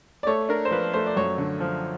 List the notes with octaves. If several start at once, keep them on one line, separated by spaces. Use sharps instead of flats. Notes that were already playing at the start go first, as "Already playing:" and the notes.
D5
A3 C#5
D4 A#4
C5
F3 B4
A3 C5
D5
F#2 C#5
D3
F3